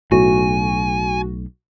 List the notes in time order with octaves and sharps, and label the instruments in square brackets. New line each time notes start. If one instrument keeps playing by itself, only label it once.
[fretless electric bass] B1 A2 [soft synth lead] F#4 [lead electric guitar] G#5